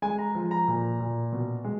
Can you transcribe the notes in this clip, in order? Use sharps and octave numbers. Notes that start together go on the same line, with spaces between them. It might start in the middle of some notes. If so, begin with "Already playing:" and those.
G#3 G#5
A#5
F3
A#5
A#2
A#2
B2
G#3